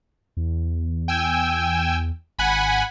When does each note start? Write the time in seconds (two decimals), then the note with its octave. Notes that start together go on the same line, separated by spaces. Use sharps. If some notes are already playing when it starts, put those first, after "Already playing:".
0.37 E2
1.08 G5 G#5 E6
2.39 G#1 F#5 G#5 B5